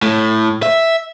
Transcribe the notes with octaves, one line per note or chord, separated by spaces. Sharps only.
A2
E5